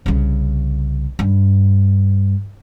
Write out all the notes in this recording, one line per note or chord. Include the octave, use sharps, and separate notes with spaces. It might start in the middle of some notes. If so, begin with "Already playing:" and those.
C2 C#3
G2